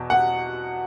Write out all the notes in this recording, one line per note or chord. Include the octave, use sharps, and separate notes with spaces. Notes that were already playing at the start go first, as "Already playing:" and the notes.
Already playing: E2 B2
F#5